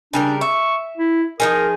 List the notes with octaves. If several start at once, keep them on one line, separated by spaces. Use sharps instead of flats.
C#3 G3 D4 A#4
E5 C#6
E4
F3 D#4 G#4 A#4